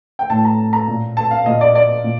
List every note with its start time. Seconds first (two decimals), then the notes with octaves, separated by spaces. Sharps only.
0.19 G5
0.30 A2 A5
0.45 A#5
0.73 A#5
0.88 A#2
1.17 A5
1.31 F5
1.46 A#2 D#5
1.61 D5
1.75 D5
2.04 A#2